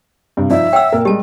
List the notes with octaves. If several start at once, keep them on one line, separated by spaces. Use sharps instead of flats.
G2 C3
F3 D#4 D5 E5
C#5 F#5 G5 E6
A#2 A#4
G3 G#3 G4 A5